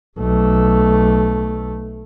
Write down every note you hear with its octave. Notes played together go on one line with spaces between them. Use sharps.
B1 A3